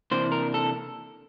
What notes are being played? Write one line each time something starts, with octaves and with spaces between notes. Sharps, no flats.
C3 E3 A#3 D4 C5
A#4
A4